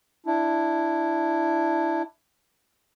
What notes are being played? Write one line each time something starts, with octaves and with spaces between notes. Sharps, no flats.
D4 E4